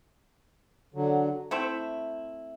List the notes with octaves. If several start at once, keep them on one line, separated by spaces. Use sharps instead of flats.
D3 F#3
A3 C4 E4